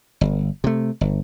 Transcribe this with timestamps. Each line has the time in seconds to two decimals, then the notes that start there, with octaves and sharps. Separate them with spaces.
0.21 G1
0.64 C3 A3
1.01 G1